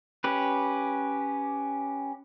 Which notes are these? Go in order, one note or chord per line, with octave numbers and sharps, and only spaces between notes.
C#4 G4 B4